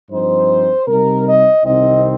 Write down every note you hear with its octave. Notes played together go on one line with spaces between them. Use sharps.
G2 F3 C4 D#4 C5
C3 G3 D#4 A#4
D#5
C2 C3 D#3 C4 D#4 D#5